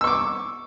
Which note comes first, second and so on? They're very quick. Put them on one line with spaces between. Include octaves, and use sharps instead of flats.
E6 C#6 D6